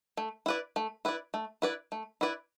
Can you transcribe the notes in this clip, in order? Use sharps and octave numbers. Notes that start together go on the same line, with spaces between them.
A3
E4 B4 D5
A3
E4 B4 D5
A3
E4 B4 D5
A3
E4 B4 D5